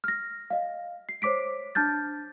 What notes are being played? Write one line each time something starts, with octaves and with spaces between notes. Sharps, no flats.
F6 A#6
D#5 F5
C7
C5 C#5 D6 B6 D7
D4 A5 F6 G6 A6